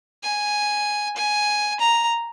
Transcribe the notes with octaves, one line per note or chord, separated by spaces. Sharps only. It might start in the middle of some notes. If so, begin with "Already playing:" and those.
G#5
G#5
A#5